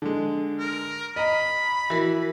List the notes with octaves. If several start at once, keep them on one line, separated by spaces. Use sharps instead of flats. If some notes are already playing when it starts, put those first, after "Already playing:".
D3 G#3
A#4
D#5 A#5 B5
E3 F#4 A#4